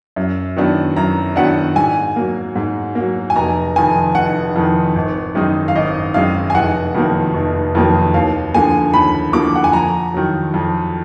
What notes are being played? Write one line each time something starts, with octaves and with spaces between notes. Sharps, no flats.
F#2
D#3 F#3 B3 D4
F#2 A#5
D#3 F#3 B3 D4 F#5
G#2 G#5
F#3 A#3
G#2
A#3
F#3
G#5
F1 A#5
F2 D#3 G#5
F1 F#5
F2 D#3
G#1
F#2 D#3 G#3 D#4
F5
G#1 D#5
F#2 D#3 G#3 D#4 F5
G#5
F1 F#5
F2 D#3 F#3 A#3
F1
F2 D#3 F#3 A#3
D#2 F5
D3 F3 A#3 G#5
D#2 B5
D3 F3 A#3 D6
F#5
G#5
F2 A#5
D#3 F#3
F2